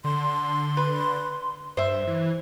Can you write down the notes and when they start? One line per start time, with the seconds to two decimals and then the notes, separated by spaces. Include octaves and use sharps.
0.04 D3 C6
0.77 B4
1.77 G2 C5 E5
2.07 E3